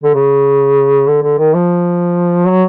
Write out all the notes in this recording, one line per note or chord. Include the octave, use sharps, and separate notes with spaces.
D3
C#3
D3
D3
D#3
F3
F#3